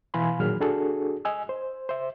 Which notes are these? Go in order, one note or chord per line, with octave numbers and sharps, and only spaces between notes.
B2 E3 F5 G#5 B5 C6
A#2 D#3 F#3 G#4 F6
D4 F#4 G#4 A4
D#5 G#5 E6
C5
C5 E5